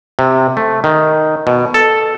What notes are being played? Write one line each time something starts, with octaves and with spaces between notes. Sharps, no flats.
C3
A3
D#3
B2
A4